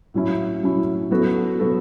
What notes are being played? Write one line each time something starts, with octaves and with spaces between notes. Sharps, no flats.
A2 F#3 C#4 E4
A2 F#3 C#4 E4
F#3 B3 F#4 A4
F#3 B3 F#4 A4